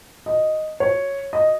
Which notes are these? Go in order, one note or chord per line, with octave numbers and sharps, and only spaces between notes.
D#5
C#5
D#5